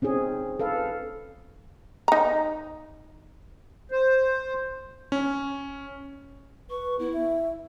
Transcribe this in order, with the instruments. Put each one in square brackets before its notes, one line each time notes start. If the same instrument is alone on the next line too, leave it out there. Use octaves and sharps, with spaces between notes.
[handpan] C4 C#4 D#4 G#4
A4 B4 F5
[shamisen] D#4 A#5
[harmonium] C5
[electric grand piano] C#4
[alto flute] B4 [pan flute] C#6
[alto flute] B3 [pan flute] E4
[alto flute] E5